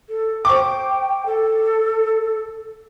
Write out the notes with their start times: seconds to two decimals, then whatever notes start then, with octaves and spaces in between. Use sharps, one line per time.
0.09 A4
0.45 C5 G5 C#6 D6
1.26 A4